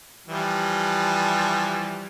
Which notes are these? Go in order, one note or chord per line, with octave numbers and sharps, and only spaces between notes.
E3 F3 G3